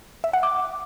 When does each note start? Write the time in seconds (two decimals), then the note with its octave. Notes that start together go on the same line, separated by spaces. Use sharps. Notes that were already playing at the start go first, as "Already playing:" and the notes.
0.24 E5
0.33 F#5
0.43 D6